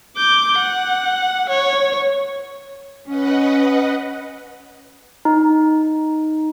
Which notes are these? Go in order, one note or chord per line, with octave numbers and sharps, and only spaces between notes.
D6 G6
F#5
C#5
C#4 B4 D#5 F#5
D#4